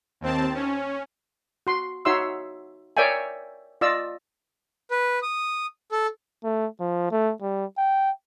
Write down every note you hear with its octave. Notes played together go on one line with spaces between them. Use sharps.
D#2 C4 A5
C#4
F#4 C6
D#4 F#4 C#5 E5 C6 E6
A#4 C#5 D5 E5 G5 G#5
F4 D5 D#5 E6
B4
D#6
A4
A3
F3
A3
G3
G5